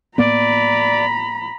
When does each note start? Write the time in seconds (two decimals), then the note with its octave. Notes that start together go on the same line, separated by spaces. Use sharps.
0.18 A2 A#3 B3 D5 A#5 B5